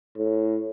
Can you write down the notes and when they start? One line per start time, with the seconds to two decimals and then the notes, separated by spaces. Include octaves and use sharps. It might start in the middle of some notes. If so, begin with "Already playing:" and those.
0.17 A2